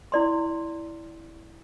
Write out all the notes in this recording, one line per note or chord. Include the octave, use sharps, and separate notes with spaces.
E4 D5 C6